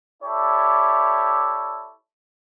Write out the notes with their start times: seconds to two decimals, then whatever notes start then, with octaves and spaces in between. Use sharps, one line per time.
0.23 E4 G4 A4 C#5 D5 E5